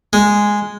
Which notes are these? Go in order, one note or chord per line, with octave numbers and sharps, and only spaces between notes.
G#3